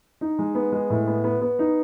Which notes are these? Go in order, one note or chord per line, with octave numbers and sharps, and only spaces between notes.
D#4
G#3
B3
G#3
A2
B3
B3
B3
D#4